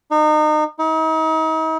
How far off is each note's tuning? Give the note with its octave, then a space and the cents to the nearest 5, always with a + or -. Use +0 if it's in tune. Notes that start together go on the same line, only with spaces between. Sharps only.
D#4 -30
D#4 +40